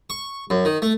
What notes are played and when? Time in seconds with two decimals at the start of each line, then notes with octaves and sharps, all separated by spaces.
0.10 C#6
0.50 F#2
0.65 D#3
0.82 A3